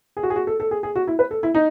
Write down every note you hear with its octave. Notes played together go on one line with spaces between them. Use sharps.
G#4
F#4
G#4
F#4
A4
A4
G#4
G#4
F#4
E4
B4
A4
E4
D#4